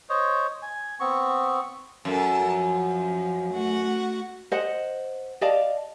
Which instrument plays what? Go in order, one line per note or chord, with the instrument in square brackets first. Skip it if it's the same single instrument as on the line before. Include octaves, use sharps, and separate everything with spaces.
[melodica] C5 C#5 D#5
G#5
B3 C4 C#6
[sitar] F#2 [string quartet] A4 A#4 A5
[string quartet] F3
A3 F#4 F#5
[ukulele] C5 D#5 F#5
D5 D#5 F5 A5